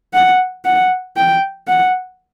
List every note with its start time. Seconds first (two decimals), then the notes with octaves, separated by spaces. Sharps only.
0.14 F#5
0.65 F#5
1.17 G5
1.68 F#5